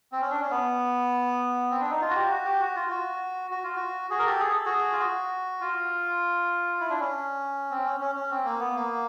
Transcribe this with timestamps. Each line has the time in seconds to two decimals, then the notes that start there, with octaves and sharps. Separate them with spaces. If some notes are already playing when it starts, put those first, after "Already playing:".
0.12 C4
0.21 C#4
0.30 D4
0.41 C#4
0.51 B3
1.71 C4
1.81 D4
1.91 D#4
2.01 F4
2.10 F#4
2.15 G4
2.31 F#4
2.45 G4
2.60 F#4
2.76 F4
2.91 F#4
3.51 F#4
3.64 F4
3.76 F#4
4.10 F#4 G#4
4.19 A#4
4.26 G4 A4
4.40 G#4
4.53 A4
4.65 F#4 G#4
4.93 F4
5.00 F#4
5.61 F4
6.80 E4
6.90 D4
7.00 C#4
7.71 C4
7.85 C#4
8.01 C#4
8.15 C#4
8.31 C4
8.45 A#3
8.60 B3
8.75 A#3